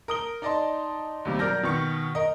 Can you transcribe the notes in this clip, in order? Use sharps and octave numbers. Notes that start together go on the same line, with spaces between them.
A#4 D#6 G7
D#4 D5 D#5 A5 C6
D#2 C3 G3
B1 A#4 D5 F6 G6 A#6
B2 D#3 C#6 C#7
A#4 D#5